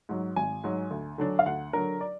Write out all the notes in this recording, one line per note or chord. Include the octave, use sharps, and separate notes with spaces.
G#2 F#3
G#1 G#5
G#2 F#3
D2
D3 F#3 D4
F5
D2 F#5
D3 F#3 D4 A#4
D5